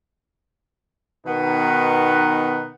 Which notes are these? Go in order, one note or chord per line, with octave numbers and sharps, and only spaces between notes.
B2 D#3 B3 D#4 B4